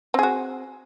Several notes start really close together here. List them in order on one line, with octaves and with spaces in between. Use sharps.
C4 G#4 F#4